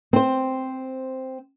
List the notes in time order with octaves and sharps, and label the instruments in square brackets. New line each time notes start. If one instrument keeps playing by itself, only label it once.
[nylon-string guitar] C4 C5